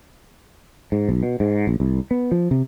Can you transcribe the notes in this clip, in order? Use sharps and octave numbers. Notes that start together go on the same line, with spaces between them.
G#2
B1
B2
G#2
A#1
C2
B3
F3
C3